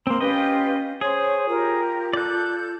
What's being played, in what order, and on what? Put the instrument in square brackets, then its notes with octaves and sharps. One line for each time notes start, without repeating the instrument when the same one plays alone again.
[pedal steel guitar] A#3 C4 [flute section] A#4 C6
[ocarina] C#4 [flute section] F4 G4 B4 [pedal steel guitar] D#5 G5
[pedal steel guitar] G#4 [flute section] C5 [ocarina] C#5
[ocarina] F4 [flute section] G4 A#4
[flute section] A4 G6 [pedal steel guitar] D5 F#6